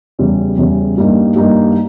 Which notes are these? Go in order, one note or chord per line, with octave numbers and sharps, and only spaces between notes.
E2 C#3 G3
E2 C#3 G3
G2 G3 A#3 D#4
G2 G3 A#3 D#4